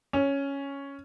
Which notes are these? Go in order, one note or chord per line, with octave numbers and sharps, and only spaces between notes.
C#4